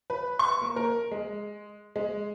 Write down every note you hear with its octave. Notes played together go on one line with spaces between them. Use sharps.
B4
C#6
A#3
A#4
G#3
G#3